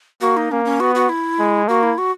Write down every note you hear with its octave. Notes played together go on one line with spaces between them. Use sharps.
A#3 F#4
D#4
A#3 C#4
C#4
B3 F#4
F#4
E4
G#3
A#3 F#4
E4
F#4